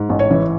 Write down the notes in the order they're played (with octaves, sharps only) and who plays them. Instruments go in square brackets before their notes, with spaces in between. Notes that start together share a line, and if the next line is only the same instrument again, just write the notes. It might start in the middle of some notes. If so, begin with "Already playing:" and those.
Already playing: [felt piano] G#2
A1
C#5
E3